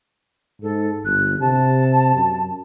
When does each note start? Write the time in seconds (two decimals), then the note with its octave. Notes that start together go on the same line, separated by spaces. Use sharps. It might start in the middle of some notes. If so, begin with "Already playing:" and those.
0.62 G#2 A4
1.05 G1 F#6
1.40 C3 A5
2.15 F#2